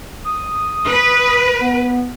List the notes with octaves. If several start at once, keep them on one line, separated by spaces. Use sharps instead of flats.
D#6
B4
B3